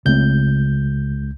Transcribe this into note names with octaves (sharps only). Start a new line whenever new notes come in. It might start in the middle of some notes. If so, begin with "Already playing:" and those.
C#2 C#3 A3 C4 G6